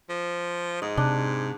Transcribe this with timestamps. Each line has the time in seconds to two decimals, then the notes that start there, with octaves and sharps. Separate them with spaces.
0.09 F3
0.82 G#2 D#5
0.97 C3 D4